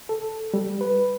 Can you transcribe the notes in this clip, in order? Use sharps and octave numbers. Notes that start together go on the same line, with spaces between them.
A4
G3
B4